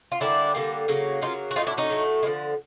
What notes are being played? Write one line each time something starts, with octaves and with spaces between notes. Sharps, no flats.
F4
D3 G3 A#3 D4 E4
D3 G3 A#3
C#3 F#3 A#3
C#3 F#3 A#3 D#4 F4
F#4
A2 F#3 A3 D#4 F4
D4 E4
C#4 D#4
A2 F#3 A3
G#3
D3 F3